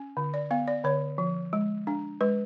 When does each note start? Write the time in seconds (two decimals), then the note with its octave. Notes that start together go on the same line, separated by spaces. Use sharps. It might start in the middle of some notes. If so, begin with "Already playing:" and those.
Already playing: C#4
0.17 D3
0.34 D5
0.51 B3 F5
0.68 D5
0.84 D3 C#5
1.18 F3
1.53 G#3
1.87 D4
2.21 G#3 B4